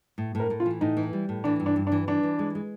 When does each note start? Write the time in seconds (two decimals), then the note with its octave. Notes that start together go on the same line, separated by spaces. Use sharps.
0.18 A2
0.35 A2
0.40 A#4
0.50 A2
0.60 F4
0.66 E3
0.81 A2 D#4
0.97 E3
1.13 G3
1.29 A2
1.44 E3 D4
1.60 G2
1.66 D4
1.76 G2
1.87 D4
1.92 E3
2.07 E3 D4
2.23 E3
2.39 G#3
2.55 G#3